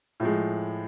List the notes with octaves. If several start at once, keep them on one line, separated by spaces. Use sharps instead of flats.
A2 F3 G#3